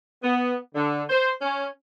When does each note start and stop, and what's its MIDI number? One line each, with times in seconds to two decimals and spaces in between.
0.23 0.56 59
0.75 1.03 50
1.09 1.29 72
1.41 1.66 61